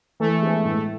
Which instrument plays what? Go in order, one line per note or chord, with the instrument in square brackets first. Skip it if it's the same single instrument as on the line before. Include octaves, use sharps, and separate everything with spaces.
[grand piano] E3 [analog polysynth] A3
[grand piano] G#3 B3
A2